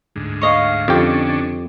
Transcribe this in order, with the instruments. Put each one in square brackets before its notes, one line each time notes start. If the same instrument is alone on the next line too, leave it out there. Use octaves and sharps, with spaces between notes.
[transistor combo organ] D2 G#2
[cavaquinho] C#5 D#5 F5
[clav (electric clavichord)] F2 G4 [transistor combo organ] D3 C#4 D4